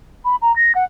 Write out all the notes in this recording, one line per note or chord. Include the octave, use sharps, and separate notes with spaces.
B5
A#5
A#6
F#5